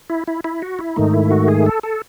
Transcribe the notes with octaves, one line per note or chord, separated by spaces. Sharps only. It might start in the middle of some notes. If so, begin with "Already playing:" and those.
E4
E4
E4
F#4
E4
G#2 D#3 A3 D#4
E4
F#4
G#4
A4
A4